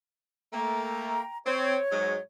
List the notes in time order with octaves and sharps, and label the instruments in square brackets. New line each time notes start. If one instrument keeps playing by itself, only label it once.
[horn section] A3 A#3 [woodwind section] G5 A#5
[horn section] C4 [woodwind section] C#5
[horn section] G#2 F#3 G#3